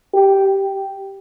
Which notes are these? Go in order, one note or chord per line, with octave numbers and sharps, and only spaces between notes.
G4